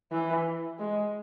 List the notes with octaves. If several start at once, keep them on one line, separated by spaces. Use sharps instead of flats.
E3
G#3